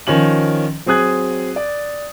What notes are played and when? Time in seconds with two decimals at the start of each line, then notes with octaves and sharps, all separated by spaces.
0.07 D#3 F3 C#4 F#7
0.86 F#3 C4 G#4 D#6 F#6 G#6
1.56 D5